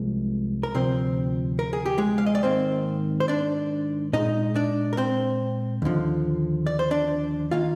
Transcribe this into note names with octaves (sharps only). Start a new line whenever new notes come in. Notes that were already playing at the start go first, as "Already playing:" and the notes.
Already playing: C2 C3 F3 G#3 A#3
A#4
D2 C3 F3 C4 C5
A#4
G#4
G4
G#3 G#4
F5
D#5
D5
G#2 D#3 A#3 C4 C5
C5
D4 D5
A#2 G#3 D#4 D#5
D4 D5
A#4
C4 C5
D#2 D3 F3
D5
C5
D4 D5
D#3 A#3 F4 F5